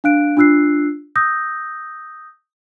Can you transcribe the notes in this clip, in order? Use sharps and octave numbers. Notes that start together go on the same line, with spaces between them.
D4 F5 F#6 D7
D4 F4 E6 F#6 C7
D#6 E6 G6 A#6